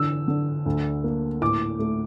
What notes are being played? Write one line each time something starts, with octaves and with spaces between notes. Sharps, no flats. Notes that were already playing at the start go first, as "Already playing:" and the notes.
Already playing: D3 E3 E6
D3
D2
A#3
A2 D6
A3